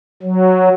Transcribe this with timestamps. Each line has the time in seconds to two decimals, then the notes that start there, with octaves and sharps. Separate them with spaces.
0.23 F#3